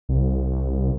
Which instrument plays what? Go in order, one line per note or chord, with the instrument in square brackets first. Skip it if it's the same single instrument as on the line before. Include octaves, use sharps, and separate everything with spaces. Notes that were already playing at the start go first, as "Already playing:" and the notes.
[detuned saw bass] C2